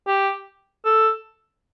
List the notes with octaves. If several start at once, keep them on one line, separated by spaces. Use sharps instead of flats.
G4
A4